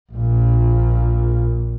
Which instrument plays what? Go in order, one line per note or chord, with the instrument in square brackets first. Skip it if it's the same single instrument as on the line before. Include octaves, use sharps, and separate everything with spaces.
[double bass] A#1 A#2